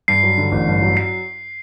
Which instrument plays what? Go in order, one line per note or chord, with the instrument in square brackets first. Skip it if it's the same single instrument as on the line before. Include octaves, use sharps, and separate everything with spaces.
[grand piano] G2 [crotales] C7
[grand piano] F#3
D3
A1
G2
F#3
[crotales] C7